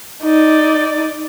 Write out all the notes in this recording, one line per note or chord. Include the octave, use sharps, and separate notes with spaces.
D#4 D5